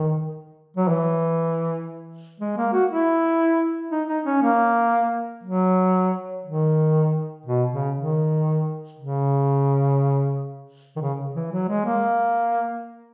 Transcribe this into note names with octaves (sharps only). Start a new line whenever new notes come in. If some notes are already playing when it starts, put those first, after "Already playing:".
Already playing: D#3
F#3
E3
G#3
A#3
F#4
E4
D#4
D#4
C#4
A#3
F#3
D#3
B2
C#3
D#3
C#3
D#3
C#3
E3
F#3
G#3
A#3